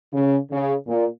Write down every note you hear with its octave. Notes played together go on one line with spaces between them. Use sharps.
C#3
C#3
A#2